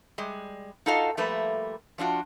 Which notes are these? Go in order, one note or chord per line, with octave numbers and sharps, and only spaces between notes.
G3 G#3
D#4 F4 F#4 A4 D#5 F5
F3 G3 A3 A#3 B4 E5
F3 D4 F4 F#4